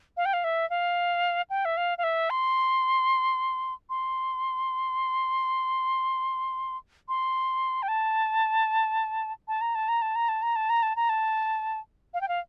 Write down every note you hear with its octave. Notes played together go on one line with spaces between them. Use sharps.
F5
G5
F5
E5
F5
G5
E5
F5
F5
E5
C6
C6
C6
G5
A5
A5
A#5
A5
A#5
A5
A#5
A5
A#5
A5
A#5
A5
A#5
A5
F5
G5
F5